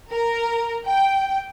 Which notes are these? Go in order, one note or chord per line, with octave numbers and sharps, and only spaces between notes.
A#4
G5